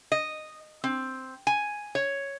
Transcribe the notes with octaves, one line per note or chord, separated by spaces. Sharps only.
D#5
C4
G#5
C#5